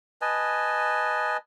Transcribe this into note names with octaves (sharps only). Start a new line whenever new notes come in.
B4 D#5 G#5 A5